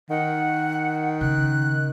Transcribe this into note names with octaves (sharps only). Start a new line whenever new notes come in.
D#3 F#5
C#3 F#6